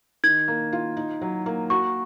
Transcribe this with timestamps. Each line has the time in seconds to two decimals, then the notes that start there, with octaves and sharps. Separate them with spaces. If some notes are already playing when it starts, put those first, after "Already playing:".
0.24 D#3 G#6
0.48 A#3
0.73 F4
0.97 D#4
1.21 F#3
1.46 A#3
1.70 F#4 C#6